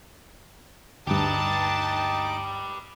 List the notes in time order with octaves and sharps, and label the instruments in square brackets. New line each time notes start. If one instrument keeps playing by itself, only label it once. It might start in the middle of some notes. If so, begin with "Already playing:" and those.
[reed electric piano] D2 G2 [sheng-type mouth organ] D#4 D6 [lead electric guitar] G4 B4 [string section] A5